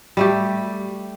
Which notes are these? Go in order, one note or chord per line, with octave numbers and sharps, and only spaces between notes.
G3 A3 G4